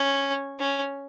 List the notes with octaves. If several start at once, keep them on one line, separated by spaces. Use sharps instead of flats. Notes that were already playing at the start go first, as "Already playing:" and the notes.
Already playing: C#4
C#4